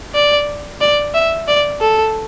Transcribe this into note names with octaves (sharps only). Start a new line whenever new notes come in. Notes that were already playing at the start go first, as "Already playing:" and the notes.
D5
D5
E5
D5
A4